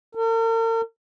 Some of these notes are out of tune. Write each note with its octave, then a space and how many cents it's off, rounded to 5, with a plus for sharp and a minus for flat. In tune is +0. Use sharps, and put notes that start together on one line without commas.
A#4 -45